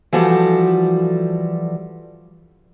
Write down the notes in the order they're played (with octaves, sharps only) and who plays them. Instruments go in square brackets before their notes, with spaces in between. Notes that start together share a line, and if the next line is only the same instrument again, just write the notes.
[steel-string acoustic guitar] E3 F3 G3 F#4 G4 A4